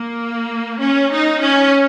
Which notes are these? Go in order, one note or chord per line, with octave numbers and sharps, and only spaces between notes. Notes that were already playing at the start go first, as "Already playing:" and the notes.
Already playing: A#3
C#4
D#4
C#4